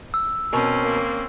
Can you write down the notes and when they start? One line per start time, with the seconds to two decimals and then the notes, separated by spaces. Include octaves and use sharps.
0.14 E6
0.53 B2 C4 C#4 A#4
0.84 A#3